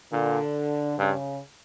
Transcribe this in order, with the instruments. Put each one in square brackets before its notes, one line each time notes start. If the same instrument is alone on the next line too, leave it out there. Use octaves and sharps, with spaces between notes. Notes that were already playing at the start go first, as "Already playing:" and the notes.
[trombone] A#2 [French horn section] D3
[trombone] G2 [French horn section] C#3